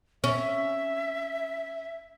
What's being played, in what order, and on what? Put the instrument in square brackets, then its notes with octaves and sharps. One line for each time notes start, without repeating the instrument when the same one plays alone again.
[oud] C#4 [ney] E5